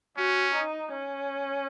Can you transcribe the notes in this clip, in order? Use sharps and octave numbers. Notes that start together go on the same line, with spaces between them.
C#4 F#4
D#4
C#4